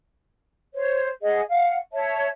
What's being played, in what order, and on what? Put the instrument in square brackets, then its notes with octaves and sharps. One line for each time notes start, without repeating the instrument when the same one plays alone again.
[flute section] C5 C#5
G#4 D#5 F#5
F5 F#5
C#5 E5 A5